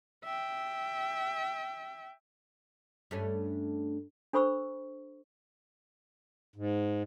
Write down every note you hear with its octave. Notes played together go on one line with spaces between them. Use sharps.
E5 G5
G2 A3 C#4
D4 A4 C5 B5 C#6 E6
G#2